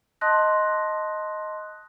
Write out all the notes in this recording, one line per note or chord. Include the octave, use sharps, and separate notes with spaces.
D#5 A5 C6 D#6 F#6 A#6